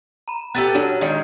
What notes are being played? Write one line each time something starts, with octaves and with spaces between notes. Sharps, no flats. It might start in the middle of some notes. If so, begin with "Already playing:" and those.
A#5 B5
B3 G4 A4 F#6 A6 D#7
F#3 D4
D#3 G#3